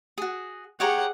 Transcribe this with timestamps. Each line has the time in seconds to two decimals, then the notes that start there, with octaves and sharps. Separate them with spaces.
0.18 F#4 G#4
0.80 G4 G#4 C#5 F#5 A#5